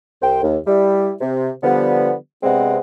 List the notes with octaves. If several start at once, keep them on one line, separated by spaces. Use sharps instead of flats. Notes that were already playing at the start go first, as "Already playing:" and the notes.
C2 C5 G5
D#2
G3 E4
C3
D3 F3 G3 B3
C3 G#3 B3 C4 D4 F#5